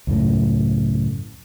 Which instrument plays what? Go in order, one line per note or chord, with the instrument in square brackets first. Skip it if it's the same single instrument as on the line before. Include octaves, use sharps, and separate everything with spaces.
[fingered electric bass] C#2 F#2 A2